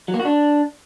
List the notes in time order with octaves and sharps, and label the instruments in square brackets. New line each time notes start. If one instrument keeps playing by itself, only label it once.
[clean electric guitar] F#3
A#3
F#4
D4